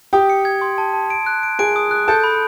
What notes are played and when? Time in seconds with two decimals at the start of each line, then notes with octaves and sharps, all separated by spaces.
0.13 G4 G5 D#6
0.30 C#7
0.45 G#6
0.61 C6
0.78 A5
0.94 A5
1.10 D7
1.26 F#6
1.43 D7
1.59 G#4 G#5 D7
1.76 D#6
1.91 F#6
2.08 A4 A5 G6
2.24 B5